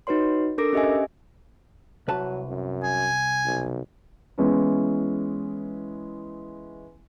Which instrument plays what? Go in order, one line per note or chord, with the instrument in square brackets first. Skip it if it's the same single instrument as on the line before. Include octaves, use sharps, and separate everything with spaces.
[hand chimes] D#4 F#4 B4 C#5 C6
D4 A4 A#4 D6 A#6 D7
C#4 G4 D#5 E5 G#5
[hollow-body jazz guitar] C2 B4 A5 [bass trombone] F#3
[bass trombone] F#2
[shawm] G#5
[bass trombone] B1
[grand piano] E3 G#3 B3 C#4 E4